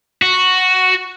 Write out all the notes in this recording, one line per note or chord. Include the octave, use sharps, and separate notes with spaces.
F#4